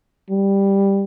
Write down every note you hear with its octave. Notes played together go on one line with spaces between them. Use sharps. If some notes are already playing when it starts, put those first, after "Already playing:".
G3